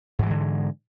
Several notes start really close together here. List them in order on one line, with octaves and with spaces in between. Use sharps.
G#2 E3 G#3 D3